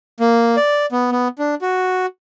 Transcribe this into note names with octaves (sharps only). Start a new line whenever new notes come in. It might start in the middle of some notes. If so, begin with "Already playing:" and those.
A#3
D5
B3
B3
D4
F#4